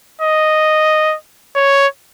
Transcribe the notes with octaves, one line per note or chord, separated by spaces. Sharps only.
D#5
C#5